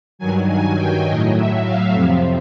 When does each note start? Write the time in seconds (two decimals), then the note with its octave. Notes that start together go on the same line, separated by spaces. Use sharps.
0.19 G2 D#3 F#3 G#5
0.48 G#5
0.77 G5
1.06 F#3 D#5
1.10 A2
1.35 E5
1.64 F5
1.93 F2 C3 F3 F5